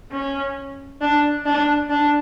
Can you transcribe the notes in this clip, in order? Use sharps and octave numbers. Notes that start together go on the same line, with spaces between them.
C#4
D4
D4
D4